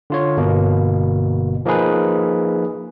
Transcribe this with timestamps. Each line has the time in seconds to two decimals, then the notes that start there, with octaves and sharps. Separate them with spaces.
0.10 D3 F4 C#5
0.37 G1 B2 A#3
1.65 F3 A#3 D#4 G#4 B4